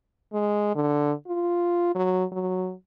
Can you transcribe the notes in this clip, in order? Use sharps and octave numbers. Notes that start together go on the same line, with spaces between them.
G#3
D3
F4
F#3
F#3